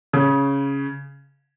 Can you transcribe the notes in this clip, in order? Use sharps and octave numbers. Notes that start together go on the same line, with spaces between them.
C#3